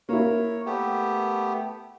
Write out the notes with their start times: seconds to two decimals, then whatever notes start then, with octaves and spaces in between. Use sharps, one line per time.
0.09 A#3 E4 C#5
0.66 A3 B3 G4